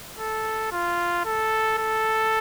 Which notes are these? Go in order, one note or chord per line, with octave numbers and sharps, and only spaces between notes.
A4
F4
A4
A4